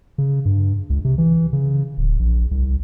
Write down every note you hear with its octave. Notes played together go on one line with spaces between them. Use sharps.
C#3
G2
C#2
C3
E3
C#3
D1
A#1
C2